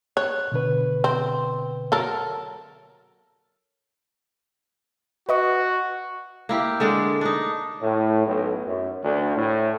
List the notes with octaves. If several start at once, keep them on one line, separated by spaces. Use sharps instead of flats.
C#5 F#6
B2 D3 B4
C4
F#3 A4 A#4
F#4 B4 D#5 C#6
A#3 E4 G4
D3 G#3 D4
D4 D#4
A2
B1
F#2
D2
A2